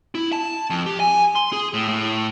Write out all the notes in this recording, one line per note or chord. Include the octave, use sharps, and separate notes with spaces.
E4
A5
F2
G4
G#5
C6
G#4
A2
A2